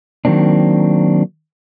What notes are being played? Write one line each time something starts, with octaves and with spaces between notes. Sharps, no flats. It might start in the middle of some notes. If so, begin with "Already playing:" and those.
D#3 F#3 A#3 C4 D4